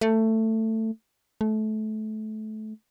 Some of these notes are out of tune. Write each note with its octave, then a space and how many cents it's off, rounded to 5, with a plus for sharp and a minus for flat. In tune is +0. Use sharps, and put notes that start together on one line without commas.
A3 +15
A3 -25